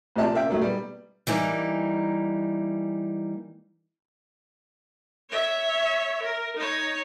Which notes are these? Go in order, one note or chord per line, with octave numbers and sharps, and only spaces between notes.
A1 C3 F3 G4 D5 A5
A#3 C#4 E5 F5 G5
D#3 F#3 A3 D#4
G3 B3
E3 G3 A#3 D#4
C#5 E5
A#4
D#4 C#5